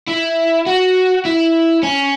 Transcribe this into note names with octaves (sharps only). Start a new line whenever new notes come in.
E4
F#4
E4
C#4